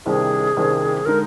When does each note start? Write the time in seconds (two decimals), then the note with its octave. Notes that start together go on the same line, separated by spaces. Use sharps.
0.06 C2 C3 D#3 G3 D4 G#4
0.57 C2 C3 D#3 G3 D4
1.06 D3 G#3 D#4 A#4